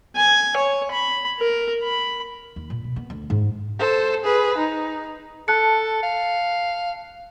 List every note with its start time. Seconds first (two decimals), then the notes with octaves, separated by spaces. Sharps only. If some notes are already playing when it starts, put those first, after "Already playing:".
0.16 G#5
0.57 C#5
0.92 B5
1.39 A#4
1.84 B5
2.56 D#2
2.70 A#2
2.84 B2
2.96 B3
3.10 D2
3.30 G#2
3.79 A4 C5
4.24 G#4 B4
4.57 D#4
5.48 A4 A5 F#6 C#7
6.03 F5